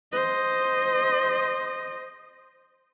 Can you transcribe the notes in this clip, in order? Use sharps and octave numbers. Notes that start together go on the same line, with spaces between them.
C5 D#5